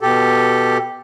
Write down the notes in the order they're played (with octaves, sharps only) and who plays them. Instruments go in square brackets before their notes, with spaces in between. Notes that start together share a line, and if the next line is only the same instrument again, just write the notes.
[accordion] B2 G4 A4